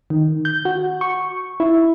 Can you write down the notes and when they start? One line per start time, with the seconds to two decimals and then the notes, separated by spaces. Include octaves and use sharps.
0.10 D#3
0.45 G6
0.65 F#4
1.01 C#6
1.60 E4